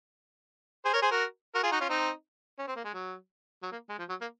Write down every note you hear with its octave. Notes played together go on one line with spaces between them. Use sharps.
G#4 C5
A#4 C#5
G#4 C5
F#4 A#4
F#4 A#4
F4 G#4
D#4 F#4
C#4 F4
C4 D#4
C#4
C4
A#3
G#3
F#3
F#3
A#3
G#3
F3
F#3
A#3